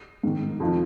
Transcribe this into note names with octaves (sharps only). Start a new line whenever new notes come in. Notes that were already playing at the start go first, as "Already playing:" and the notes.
G#2 D#3
F2 F3